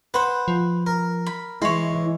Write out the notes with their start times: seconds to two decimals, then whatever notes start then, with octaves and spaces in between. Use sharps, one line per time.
0.14 B4 C5 F#5
0.48 F3
0.87 A#4
1.26 B5
1.62 E3 G#3 E4 C#5 C6